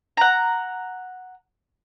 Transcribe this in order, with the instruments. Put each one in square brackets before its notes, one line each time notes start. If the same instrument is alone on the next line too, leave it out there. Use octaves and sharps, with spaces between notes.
[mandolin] F#5 A#5